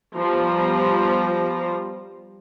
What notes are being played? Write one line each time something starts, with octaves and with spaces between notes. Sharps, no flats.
F3 G3 B3 C5 A#5